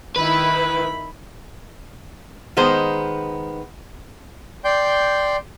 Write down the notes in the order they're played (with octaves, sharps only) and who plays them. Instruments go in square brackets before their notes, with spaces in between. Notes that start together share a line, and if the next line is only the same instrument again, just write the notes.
[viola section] D#3 E4 [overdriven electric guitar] B4 [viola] B5
[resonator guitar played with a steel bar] D#3 G#3 B3 C5
[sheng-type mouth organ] D5 G5 C6 G6